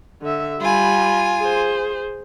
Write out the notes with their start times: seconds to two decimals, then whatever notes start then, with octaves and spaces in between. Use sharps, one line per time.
0.22 D3 E5
0.60 G3 F4 G#5 B5
1.39 G#4 C5